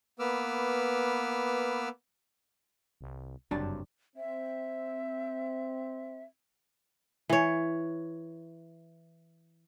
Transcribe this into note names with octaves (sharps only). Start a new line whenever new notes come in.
A#3 B3 B4 D6 E6 F6
C2
F#1 G2 C3 F#3 D4 A5
C4 E5
E3 C#5